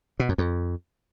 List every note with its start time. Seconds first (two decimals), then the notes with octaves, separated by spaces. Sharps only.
0.20 B2
0.29 F#2
0.38 F2